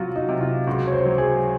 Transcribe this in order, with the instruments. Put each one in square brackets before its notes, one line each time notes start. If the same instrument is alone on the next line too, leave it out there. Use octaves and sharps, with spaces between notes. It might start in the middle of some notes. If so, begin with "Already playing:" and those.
Already playing: [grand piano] C3 F#3 [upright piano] F4 F#4
[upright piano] D#4
[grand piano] C3
[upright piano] F4
[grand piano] C#2 [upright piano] F#4
[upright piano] C#5
C5
[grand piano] F#3
[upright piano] G#4